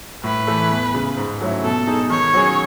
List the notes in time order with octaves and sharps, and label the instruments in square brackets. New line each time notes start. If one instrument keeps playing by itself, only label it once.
[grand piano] A2 [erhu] B4
[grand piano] E3 A3 E4
E2
C#3 G#3
G#2
F#3 A3 C#4 E4
[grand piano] B2 [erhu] A4
[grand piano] G#3 D#4 G#4
[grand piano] D#3 [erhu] C#5
[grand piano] F#3 C#4 G#4